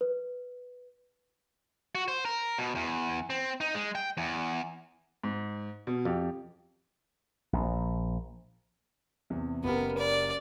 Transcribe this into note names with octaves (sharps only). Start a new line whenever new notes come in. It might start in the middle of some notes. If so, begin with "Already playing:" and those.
B4
F#4
C5
A#4
B2
E2
C4
D#4
G#3
G5
E2
G#2
B2
F2 G4
A#1
E2 C3
F#1 B3 G4 A#4
D5